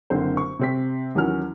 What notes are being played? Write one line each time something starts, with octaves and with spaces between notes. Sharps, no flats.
F#1 D3 C4 C5
C#6
C3 C4 B6
D#2 E3 F#3 C#4 F6